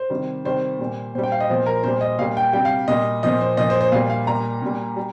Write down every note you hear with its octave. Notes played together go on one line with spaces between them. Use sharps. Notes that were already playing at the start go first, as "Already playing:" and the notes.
Already playing: C5
C3 D#3 G3
C3 D#3 G3 C5
A#2 G3
A#2 G3 C5
G5
F5
D#5
A#2 F3 C5
A#4
A#2 G3 C5
D#5
A#2 G3 F5
G5
C3 G3 G5
F5
A#2 G3 D#5
A#2 F3 D#5
C5
A#2 F3 D#5
C5
C5
A#2 G3 F5
F5
A#2 G3 A#5
A#2 G3
G3